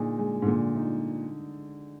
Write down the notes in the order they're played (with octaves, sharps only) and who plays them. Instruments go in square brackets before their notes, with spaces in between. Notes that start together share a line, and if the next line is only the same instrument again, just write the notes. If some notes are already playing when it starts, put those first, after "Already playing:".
Already playing: [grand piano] A#2 [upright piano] D3 D#4 G#4
[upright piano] G#3
[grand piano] G#2
[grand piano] A#2 [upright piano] D3
[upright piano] D#4